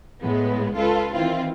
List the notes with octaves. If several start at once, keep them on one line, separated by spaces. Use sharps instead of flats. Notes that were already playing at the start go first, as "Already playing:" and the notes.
A2 G#3 B3
C#2 F4 A4 B4
D#3 E3 C4 E4 F4